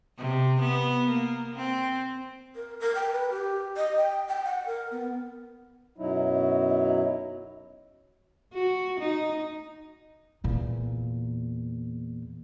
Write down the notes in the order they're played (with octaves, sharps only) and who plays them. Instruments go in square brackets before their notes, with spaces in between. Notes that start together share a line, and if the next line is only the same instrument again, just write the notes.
[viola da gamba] C3
B3
A#3
C4
[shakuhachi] A#4
A#4
G5
B4
G4
D#5
G5
G5
F#5
A#4
B3
[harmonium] F#2 B2 F#3 D#4 E4
[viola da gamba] F#4
D#4
[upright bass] E2 A#2